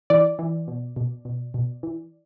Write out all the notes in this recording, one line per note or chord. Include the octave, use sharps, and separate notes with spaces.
E3 D5
E3
B2
B2
B2
B2
E3